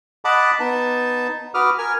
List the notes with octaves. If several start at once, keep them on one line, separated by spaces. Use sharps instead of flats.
D#5 F#5 A5 B5 D6
B3 D#4 A5
F#4 B4 D6 D#6 F6
A#4 G#5 F6